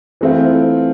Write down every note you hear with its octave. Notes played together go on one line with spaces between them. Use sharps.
E3 A3 C4 F4